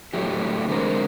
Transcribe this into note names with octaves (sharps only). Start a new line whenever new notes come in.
A2 F#3 A3 G4
D3 E3 G#3 C4 A#4